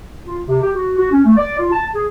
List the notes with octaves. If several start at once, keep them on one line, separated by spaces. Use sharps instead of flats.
F4
C3
G4
F#4
F#4
C#4
A3
D5
F4
A5
G#4